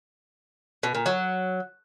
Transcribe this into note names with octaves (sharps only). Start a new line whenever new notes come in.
B2
A#2
F#3